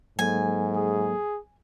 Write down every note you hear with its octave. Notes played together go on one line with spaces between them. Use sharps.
G#2 F#3 A#3 A4 G#5
G#4